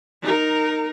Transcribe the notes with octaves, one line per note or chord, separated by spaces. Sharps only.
D#4 A#4